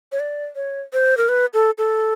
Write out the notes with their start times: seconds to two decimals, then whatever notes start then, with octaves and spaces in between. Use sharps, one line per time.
0.12 C#5
0.20 D5
0.56 C#5
0.93 C5
1.17 A#4
1.29 B4
1.54 A4
1.78 A4